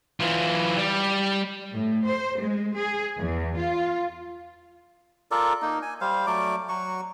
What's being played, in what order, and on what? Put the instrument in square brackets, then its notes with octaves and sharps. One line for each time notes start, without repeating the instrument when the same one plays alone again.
[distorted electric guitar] E3 F4
G3
[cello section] A2
C5
G#3
G#4
E2
F4
[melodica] F4 A4 A#4 D5
A#3 D#4
G#5
G3 C5 F5
F#3 A3 D5 D6
F#3 F#4 C#6